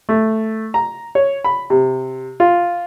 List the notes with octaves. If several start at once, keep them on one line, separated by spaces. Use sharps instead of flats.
A3
A#5
C#5
B5
C3
F4